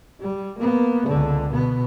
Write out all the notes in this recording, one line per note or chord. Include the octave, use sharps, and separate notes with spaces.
G3
A#3 B3
C#2 D3
B2 B3